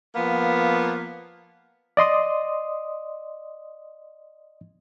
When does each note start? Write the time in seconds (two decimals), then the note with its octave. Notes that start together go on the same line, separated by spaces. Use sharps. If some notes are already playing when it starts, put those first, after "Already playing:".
0.15 F3 A#3 B3
1.97 D5 D#5 C6 D#6